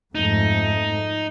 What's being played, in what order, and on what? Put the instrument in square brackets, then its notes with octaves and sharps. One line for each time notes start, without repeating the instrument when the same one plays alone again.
[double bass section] F2 G#2 A3 [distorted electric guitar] D#4